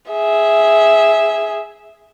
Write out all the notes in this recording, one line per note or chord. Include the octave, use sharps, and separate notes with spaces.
G#4 E5